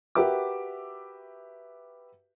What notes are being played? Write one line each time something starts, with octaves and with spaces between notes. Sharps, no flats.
F#4 G4 A#4 B4 E5 D6